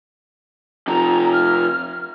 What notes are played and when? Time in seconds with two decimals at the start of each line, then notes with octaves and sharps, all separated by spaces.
0.88 C3 F3 A#5
1.33 F6